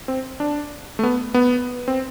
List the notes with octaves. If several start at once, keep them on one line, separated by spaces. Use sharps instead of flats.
C4
D4
A3
B3
B3
C4